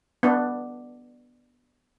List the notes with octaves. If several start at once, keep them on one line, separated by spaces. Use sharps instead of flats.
B3 D4